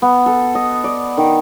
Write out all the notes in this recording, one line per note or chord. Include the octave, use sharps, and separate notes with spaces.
B3
A4
D#5
D5
D#3